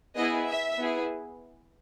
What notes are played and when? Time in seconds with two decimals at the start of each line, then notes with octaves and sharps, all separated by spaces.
0.16 B3 E4 G#4 D#5
0.48 E5
0.78 B3 E4 G#4